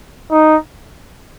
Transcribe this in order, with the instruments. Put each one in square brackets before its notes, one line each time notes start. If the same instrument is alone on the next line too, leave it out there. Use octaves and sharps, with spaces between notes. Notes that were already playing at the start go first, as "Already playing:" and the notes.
[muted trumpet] D#4